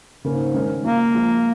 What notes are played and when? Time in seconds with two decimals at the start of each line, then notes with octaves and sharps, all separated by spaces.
0.25 G#2 C#3 A#3 C#4
0.54 D#3 G#3 C#4 A#4
0.84 C#3 G#3 A#3 F4
1.14 F3 G#3 F4 G#4